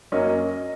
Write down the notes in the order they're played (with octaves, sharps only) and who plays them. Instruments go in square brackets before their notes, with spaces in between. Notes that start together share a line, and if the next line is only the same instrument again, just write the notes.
[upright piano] F#2 F#3 A#3 C#4 D#5